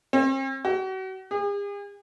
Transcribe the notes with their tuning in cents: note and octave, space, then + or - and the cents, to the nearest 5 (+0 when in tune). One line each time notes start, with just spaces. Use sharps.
C4 +45
F#4 +35
G#4 -45